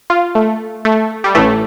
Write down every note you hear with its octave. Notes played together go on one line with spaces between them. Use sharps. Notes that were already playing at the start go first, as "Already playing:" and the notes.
F4
A3
A3
G3
A1 A2 E3 A3